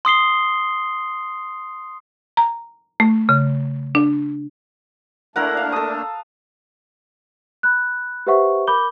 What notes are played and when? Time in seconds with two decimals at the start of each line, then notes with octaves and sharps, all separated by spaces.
0.05 C6 D#6 C7 G7
2.37 A#5
3.00 A3
3.29 C#3
3.95 D4
5.36 A3 A#3 D4 E4 A#4 F#5
5.57 F5
5.72 A4 D#6
7.63 B5 F#6
8.27 G4 B4 C5 E5 F#5 C#6
8.67 A#4 B5 D6 G6 G7